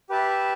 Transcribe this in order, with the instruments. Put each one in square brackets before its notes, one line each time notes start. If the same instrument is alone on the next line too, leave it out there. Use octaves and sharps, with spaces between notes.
[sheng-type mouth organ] G4 B4 E5 A5